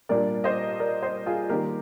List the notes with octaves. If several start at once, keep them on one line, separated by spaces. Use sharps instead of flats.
A#2 G3 D4 A#4 D5
C5 D#5
A#4 D5
C5 D#5
F4 G#4
D#3 G3 A#3 G4 A#4